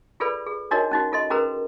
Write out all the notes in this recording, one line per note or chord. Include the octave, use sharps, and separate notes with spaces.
F4 G#4 A4 B4 D5 B5
G#4
D4 D#4 F#4 A#4 C#5 D#5
C#4 D#4 F#4
F4 A4 D#5 C6
C#4 F#4 G#4 A#4 B4 A#5